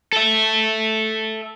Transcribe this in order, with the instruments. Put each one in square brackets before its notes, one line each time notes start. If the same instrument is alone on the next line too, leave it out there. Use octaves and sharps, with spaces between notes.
[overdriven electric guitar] A4 E5